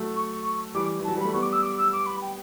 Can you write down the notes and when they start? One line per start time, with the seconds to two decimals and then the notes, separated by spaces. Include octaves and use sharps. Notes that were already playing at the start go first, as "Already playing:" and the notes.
Already playing: F#3 A3
0.16 C#6
0.74 E3 G3 D6
0.99 E3
1.04 F#3 A5
1.16 G3 B5
1.25 A3
1.33 G3 B3 C#6
1.42 D6
1.53 E6
1.63 D6
1.78 E6
1.92 D6
2.06 B5
2.22 G5